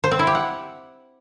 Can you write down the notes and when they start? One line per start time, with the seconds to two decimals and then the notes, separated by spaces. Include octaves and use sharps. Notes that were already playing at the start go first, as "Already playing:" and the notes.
0.04 C5
0.11 C4
0.19 E4
0.27 G4
0.35 F#5